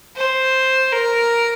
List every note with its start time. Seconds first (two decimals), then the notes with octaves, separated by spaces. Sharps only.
0.16 C5
0.92 A#4